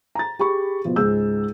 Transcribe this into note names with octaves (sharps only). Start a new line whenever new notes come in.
A#5 A6
G4 G#4 B5 C#6
B2 F3
C#2 G#2 G#4 E6 G6